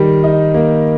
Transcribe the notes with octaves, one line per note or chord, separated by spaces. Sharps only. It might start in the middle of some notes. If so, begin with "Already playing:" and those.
Already playing: D#3 G3
D#4
A#3